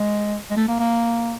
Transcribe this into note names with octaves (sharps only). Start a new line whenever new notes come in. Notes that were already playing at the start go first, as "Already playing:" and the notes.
Already playing: G#3
G#3
A3
A#3
A#3